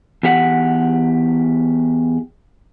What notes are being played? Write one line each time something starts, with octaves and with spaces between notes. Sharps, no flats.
E2 G4 F#5